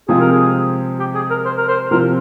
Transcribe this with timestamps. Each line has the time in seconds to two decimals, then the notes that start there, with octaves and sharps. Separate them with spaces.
0.09 C3 F3 G#3 C4 F4 G#4
0.20 A#4
0.32 G#4
1.00 G4
1.15 G#4
1.30 A#4
1.45 C5
1.57 A#4
1.68 C5
1.91 C3 F3 C4 A#4